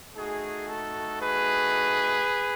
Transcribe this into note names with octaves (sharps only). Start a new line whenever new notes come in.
A3 D#4 F#4 G#4
A4
G#4 B4